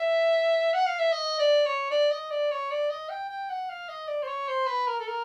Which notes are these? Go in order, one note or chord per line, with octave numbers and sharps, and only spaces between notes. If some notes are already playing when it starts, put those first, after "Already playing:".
Already playing: E5
F#5
F5
E5
D#5
D5
C#5
D5
D#5
D5
C#5
D5
D#5
G5
G5
F#5
F5
D#5
D5
C5
C#5
C5
B4
A#4
A4
A#4